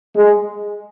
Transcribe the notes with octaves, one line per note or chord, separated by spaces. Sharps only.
G#3